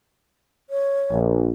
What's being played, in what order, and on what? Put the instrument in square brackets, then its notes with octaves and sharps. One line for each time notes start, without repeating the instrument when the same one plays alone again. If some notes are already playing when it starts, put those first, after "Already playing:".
[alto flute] C#5
[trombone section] A#1